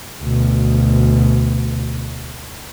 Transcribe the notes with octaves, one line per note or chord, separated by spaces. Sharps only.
D2 B2